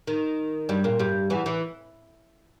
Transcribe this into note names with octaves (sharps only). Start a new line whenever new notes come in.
D#3
G2 G3
A#2 A#3
G2 G3
E2 E3
E3